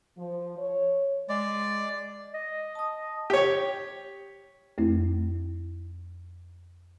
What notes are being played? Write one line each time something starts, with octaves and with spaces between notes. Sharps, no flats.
F3
C#5
G#3 D5
D#5
A5 D#6
G4 C#5
F2 A3 C4 E4